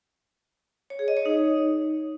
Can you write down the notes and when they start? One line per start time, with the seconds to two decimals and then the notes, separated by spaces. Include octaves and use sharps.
0.90 C#5
0.99 G#4
1.08 D#5
1.17 C#5
1.25 D#4